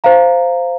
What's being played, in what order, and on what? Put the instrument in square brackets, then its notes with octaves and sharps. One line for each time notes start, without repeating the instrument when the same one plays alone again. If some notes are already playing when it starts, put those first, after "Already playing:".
[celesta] C5 F5 A#5